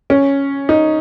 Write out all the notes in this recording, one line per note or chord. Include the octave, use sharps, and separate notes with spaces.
C#4
D#4